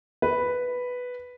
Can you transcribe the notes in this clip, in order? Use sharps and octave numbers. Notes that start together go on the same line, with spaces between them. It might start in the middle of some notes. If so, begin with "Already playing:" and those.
B4